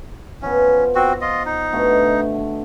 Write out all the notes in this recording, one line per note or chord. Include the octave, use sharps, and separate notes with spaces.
F3 B3 C#4
C4 F#4
F4 D#5
D#4
B2 D3 A3